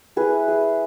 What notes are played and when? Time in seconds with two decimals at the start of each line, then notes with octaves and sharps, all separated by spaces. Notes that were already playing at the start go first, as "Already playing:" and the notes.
0.16 A3 E4 G#4 B4
0.48 G#4